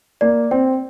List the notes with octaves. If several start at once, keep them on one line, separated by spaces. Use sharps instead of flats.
A#3 D5
C4 G5